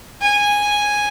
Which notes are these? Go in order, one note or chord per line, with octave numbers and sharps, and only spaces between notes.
G#5